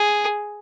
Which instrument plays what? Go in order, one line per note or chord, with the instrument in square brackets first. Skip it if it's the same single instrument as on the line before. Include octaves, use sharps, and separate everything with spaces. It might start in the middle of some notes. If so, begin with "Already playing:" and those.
Already playing: [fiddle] G#4